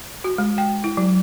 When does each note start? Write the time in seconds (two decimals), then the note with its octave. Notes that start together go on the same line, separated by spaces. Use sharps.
0.24 F#4
0.38 G#3
0.58 G5
0.84 E4
0.97 F#3